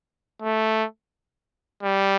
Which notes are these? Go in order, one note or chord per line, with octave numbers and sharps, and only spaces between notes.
A3
G3